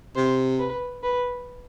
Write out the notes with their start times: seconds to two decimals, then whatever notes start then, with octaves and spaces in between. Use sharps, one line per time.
0.16 C3 C5
0.59 B4
1.03 B4